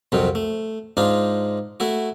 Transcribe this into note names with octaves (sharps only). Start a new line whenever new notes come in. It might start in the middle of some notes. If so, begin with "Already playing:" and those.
C2 F2 C3 F#3
A3
G#2 D4 D#4 F4
A3 E4 F#4